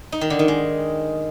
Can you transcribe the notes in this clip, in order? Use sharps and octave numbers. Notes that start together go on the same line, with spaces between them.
D#4
D#3
D3
D#3
G#3